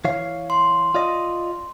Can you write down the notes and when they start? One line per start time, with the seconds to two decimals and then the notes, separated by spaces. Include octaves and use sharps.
0.05 E3 C#5 F5
0.50 C6
0.94 F4 D5 D#5